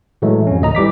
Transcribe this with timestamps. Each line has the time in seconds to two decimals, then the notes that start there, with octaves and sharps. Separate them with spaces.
0.22 A2 E3 F#3 G#3 A3
0.47 F2 C#4
0.61 A1 D2 D#5 A#5
0.75 E3 G3 D6 B6